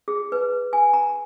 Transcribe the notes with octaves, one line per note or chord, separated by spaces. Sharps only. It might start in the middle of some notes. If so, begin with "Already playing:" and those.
G#4
B4
G#5
A#5